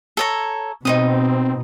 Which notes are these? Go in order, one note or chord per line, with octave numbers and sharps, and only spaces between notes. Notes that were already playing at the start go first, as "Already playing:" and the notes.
A4 C#5 A#5
B2 C4 D#4 C5 D#6